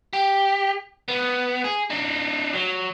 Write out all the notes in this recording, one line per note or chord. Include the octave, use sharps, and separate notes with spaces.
G4
B3
G#4
D4 D#4
F#3